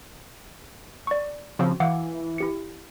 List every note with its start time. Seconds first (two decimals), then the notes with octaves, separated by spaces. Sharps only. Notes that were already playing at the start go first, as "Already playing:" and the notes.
1.07 D5 C#6
1.59 C#3 F3 C4 F#4
1.80 E3 F5 F#5 D6
2.38 E4 G4 C#7